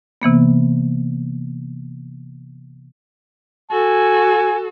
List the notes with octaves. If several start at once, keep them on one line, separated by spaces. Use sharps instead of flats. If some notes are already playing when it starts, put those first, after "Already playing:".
C3 E3 A#3 B3
F#4 A4 G#5